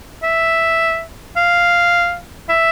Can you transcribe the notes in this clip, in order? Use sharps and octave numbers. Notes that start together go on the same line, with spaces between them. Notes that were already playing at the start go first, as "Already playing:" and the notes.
E5
F5
E5